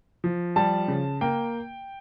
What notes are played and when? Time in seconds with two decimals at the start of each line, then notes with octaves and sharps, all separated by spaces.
0.24 F3
0.56 G3 A5
0.88 C#3
1.21 A#3 G5